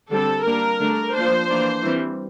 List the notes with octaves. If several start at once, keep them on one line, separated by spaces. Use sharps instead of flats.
D3 G3 C4 A4
G3 A#3 D4 A#4
D3 A3 D4
F3 A#3 D4 C5
E3 A#3 D4
E3 G3 C4